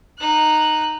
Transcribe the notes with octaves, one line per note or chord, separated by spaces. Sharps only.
D#4 F#6